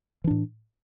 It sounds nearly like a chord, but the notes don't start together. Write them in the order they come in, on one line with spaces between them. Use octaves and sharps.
E3 D4 A2